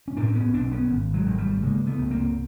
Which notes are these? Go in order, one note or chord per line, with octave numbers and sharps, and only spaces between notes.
C#4
A2 C4 D4
C4
B3 C#4
B1 C4 D4
B3 C#4
G#1
F#3 G#3
G#1
G3 A3
C#3 G#3 A#3
A3 B3
C#2
A#3 C4